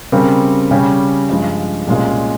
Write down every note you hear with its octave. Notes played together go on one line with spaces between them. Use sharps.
C#3 G3 C4 G4 A#4
C#3 G3 C#4 G4
G2 F3 G#3
C2 A#2 G#3 C#4 F4